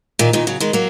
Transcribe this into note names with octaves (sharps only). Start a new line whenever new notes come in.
A#2 D#3
A#2 D#3
C#3 F#3
D#3 G#3
F#3 A#3